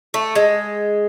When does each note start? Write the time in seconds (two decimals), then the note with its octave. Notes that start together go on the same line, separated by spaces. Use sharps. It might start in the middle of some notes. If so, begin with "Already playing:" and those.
0.14 A3
0.35 G#3